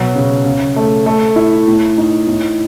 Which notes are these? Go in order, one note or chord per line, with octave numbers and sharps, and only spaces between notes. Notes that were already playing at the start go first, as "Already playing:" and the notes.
Already playing: B2 F#3
C#3
C#3
A3
A3
E4
A2
D#4
A2